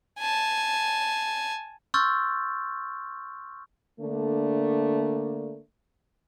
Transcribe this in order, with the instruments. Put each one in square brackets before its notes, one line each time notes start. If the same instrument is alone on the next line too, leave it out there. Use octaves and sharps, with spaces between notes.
[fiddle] G#5 A5
[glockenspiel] C6 C#6 E6 F6 G6 A6
[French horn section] D3 A3 A#3 D4